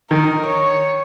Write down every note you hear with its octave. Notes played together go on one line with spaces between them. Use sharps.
D#3 A#4
C#5